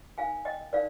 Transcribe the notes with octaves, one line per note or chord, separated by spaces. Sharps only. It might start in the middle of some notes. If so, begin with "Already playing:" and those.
D#4 A#4 F5 G#5
D#5 G5
D#4 A#4 D5 F5